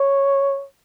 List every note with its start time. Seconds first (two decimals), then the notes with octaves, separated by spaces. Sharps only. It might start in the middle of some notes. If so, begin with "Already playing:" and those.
Already playing: C#5